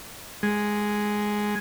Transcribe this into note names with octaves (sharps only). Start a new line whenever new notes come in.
G#3